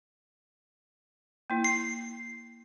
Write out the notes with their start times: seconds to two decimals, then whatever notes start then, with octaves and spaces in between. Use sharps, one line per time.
1.50 A#3 E4
1.64 C7